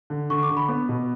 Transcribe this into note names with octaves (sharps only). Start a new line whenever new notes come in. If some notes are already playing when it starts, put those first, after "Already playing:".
D3
D3 C#6
D6
D3
B5
B3
B2